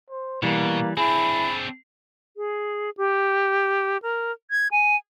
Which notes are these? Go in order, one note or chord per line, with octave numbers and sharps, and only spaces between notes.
C5
B2 E3 G3 A#3
C4 D4 E4 G#4 B5
G#4
G4
A#4
G#6
G#5